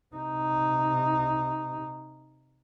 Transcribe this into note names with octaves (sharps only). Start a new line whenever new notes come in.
C3 D#4